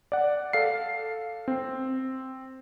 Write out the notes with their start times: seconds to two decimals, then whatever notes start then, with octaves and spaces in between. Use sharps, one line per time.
0.12 D5 F#5
0.53 A4 F5 C7
1.48 C4